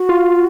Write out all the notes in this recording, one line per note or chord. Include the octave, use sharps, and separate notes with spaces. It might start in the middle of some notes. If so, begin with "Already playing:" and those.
Already playing: F#4
F4